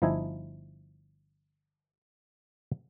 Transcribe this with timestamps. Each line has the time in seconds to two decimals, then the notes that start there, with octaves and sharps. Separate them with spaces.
0.02 G1 F3 D#4 E4 D#5 G#5